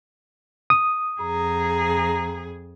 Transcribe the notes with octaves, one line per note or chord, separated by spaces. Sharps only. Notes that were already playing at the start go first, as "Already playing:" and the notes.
D#6
F2 G#4 A#5